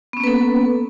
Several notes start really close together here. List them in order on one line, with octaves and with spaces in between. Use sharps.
B3 C#4 A#3 B4 A4